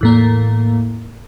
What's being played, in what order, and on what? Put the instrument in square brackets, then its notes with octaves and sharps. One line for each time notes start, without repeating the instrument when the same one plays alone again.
[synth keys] E2 A2 A#3